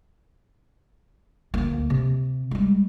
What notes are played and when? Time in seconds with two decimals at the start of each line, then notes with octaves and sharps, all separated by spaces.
1.54 D2 A#3
1.90 C3
2.51 G3 G#3